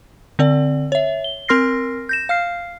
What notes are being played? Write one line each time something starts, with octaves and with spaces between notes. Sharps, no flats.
D3 C4 D5
C#5 E5
G7
C4 A#4 C6 F6 A#6 C7
G6 A#6 E7
F5 F6 C7